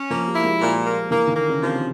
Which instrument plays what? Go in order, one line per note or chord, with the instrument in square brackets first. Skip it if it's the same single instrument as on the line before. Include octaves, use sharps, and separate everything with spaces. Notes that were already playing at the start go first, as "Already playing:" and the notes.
Already playing: [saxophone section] C#4
[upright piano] F3 [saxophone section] A#3
[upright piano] G3
[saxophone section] E4
[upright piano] G#3
[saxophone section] A#2
A#3
[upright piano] E3 [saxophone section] A#3
[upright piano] D#3
[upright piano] D3 [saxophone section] A#3
[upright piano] C#3
[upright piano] C3 [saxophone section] F3